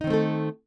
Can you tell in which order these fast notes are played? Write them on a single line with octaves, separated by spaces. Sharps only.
D#4 D#3 C4 A3 A4